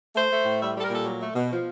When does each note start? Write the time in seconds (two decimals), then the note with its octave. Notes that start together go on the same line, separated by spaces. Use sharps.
0.15 A3 C5
0.30 A3
0.45 A2
0.60 G3 E5
0.75 G3 A4
0.83 A#4
0.90 A#2 A4
1.05 F#3
1.20 A3
1.35 B2
1.50 F3